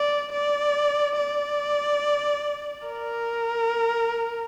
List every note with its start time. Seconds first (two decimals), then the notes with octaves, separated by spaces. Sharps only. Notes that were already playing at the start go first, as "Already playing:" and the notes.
Already playing: D5
0.32 D5
1.17 D5
2.88 A#4